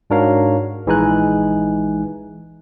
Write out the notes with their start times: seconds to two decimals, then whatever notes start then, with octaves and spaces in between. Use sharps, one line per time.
0.10 G#2 D4 F#4 A#4 C#5 F5
0.86 A#1 E3 G#3 D#4 G#5 F#6